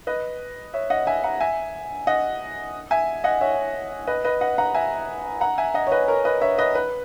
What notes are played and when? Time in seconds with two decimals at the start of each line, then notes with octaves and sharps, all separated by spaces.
0.07 B4 D#5
0.74 C#5 E5
0.90 D#5 F#5
1.07 E5 G#5
1.24 F#5 A#5
1.41 E5 G#5
2.07 D#5 F#5
2.91 E5 G#5
3.24 D#5 F#5
3.41 C#5 E5
4.07 B4 D#5
4.25 B4 D#5
4.41 D#5 F#5
4.58 F#5 A#5
4.75 E5 G#5
5.41 F#5 A#5
5.58 E5 G#5
5.74 D#5 F#5
5.87 C#5
5.92 B4 D#5
6.08 A#4 C#5
6.25 B4 D#5
6.41 C#5 E5
6.58 B4 D#5
6.75 B4